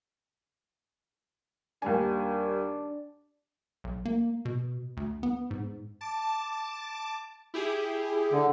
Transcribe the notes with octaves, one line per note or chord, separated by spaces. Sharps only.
D#2 G3 D4 G#5
B1
A#3
B2
D2
B3
G#2
A5 D6
E4 G4 G#4
D3